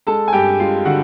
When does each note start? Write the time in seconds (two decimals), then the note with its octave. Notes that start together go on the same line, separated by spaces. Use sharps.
0.07 G#3 A4 A5
0.28 G#5
0.33 G2 G4 G5
0.60 G#3 F4 F5
0.85 D3 F#4 F#5